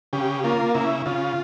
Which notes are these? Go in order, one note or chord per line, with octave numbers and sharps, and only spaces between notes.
C#3 G4
A#3 F4
C#3 E4
C#3 F4